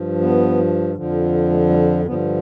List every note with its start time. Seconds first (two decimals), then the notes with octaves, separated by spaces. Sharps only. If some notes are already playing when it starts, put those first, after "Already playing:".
Already playing: G2 F3
0.21 B3
0.95 F2 D3 F3
1.50 G#3
1.69 G3
2.05 G2 D3 F3 B3